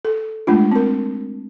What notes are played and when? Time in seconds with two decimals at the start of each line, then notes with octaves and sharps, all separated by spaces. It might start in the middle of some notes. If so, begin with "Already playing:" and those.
0.05 A4
0.47 G#3 A3 D4 F4
0.71 C4 A#4